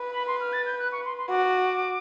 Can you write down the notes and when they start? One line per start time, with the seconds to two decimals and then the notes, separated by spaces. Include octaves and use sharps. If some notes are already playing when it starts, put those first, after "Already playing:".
Already playing: B4
0.11 B5
0.27 C6
0.40 F6
0.53 A6
0.66 G6
0.79 F#6
0.92 C#6
1.05 C6
1.17 C6
1.30 F#4 D6